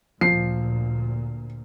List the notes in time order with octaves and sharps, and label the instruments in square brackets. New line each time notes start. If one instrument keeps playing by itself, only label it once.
[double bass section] D2 A#2 [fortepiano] F3 [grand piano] C7